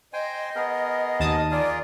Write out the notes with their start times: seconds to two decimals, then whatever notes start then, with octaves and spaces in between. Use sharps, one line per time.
0.13 C5 D#5 G5 G#5
0.56 B3 G#4 A#4
1.20 D#2 A5 D#6
1.51 F4 G#4 A#4 D5